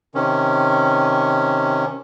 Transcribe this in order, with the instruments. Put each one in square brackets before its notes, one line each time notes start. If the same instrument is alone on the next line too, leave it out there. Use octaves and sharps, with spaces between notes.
[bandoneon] C3 D#3 C#4